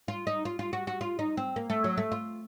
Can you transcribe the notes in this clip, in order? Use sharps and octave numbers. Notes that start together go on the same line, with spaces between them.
F4
D#4
F4
F4
F#4
F#4
F4
D#4
C4
A#3
A3
F#3
A3
F4